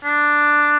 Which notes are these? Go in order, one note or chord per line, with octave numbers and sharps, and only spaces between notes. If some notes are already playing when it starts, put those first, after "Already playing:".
D4